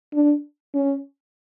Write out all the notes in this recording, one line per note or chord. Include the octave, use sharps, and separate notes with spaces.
D4
C#4